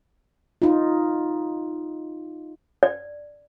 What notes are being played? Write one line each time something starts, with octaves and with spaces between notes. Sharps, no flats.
D#4 F4
D5